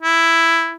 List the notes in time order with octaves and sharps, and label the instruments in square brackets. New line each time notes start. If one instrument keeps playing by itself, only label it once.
[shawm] E4